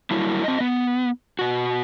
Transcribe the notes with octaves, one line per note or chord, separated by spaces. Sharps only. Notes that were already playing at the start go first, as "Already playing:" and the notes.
F#3 G3 A#3 E4
C4 D#5
B3
B2 F#4